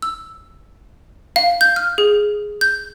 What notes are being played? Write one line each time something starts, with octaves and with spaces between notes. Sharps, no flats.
E6
F5
G6
F6
G#4
G6